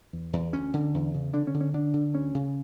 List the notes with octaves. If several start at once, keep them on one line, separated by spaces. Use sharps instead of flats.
E2
E2
D2 C#4
D3
E2
C#3
D3 D4
C#4
D3
C#4
D3 D4
D3
D2 C#4
C#3